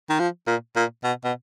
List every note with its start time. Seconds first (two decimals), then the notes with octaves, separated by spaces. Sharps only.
0.10 D#3
0.19 F3
0.47 A#2
0.76 A#2
1.04 B2
1.24 B2